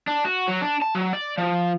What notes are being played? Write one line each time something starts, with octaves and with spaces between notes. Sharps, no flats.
D4
F#4
F#3
D4
A5
F#3
D5
F3